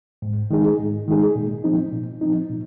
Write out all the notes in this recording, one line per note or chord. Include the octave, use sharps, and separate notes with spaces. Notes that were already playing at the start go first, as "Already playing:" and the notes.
G#2
D#3 G#3 D#4 G#4
G#2
D#3 G#3 D#4 G#4
A#2
F3 C4 D#4
A#2
F3 C4 D#4
A#2